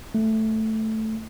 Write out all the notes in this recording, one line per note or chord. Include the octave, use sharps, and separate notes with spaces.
A3